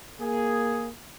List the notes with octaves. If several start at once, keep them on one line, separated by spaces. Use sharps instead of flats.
A#3 G#4